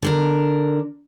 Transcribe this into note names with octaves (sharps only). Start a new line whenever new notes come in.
D3 D4 A#4